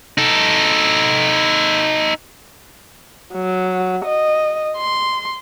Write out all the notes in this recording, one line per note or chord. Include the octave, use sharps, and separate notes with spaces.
D#4 A4
F#3
D#5
C6